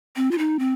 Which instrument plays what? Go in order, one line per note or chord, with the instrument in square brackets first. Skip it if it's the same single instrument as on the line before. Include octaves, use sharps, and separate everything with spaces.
[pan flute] C4
F4
D#4
C4